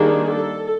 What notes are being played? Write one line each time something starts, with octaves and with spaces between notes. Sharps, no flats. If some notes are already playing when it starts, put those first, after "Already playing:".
Already playing: D#3 G3 A#3 D4 G#4
A4